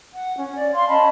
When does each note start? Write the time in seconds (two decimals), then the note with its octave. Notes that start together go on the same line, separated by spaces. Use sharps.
0.15 F#5
0.38 C#4
0.55 D5
0.73 F5 C6
0.87 C#4 D#5 A5 B5